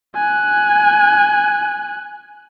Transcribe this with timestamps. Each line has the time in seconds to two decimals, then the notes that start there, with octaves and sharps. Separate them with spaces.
0.15 G#5 F#6